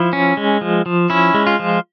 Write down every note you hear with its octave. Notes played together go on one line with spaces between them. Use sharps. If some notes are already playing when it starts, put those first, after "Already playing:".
Already playing: F3 E4
C#4
G#3
F3
F3
C#4 E4
G#3
F4
F3